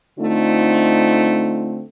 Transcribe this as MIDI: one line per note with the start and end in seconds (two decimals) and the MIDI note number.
0.19 1.81 50
0.19 1.81 57
0.19 1.81 60
0.19 1.81 63
0.19 1.81 65